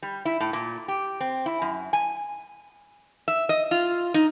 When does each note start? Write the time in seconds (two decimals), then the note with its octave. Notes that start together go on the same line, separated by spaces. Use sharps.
0.02 G3
0.25 E4
0.40 A2
0.53 A#2
0.88 G4
1.21 C4
1.46 E4
1.62 F#2
1.93 G#5
3.28 E5
3.49 D#5
3.71 F4
4.14 D#4